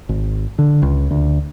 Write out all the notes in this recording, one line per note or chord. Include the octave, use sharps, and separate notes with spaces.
G#1
D3
C#2
D2